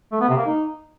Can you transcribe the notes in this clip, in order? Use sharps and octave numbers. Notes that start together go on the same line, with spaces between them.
A3
B3
C3
A#3
D#4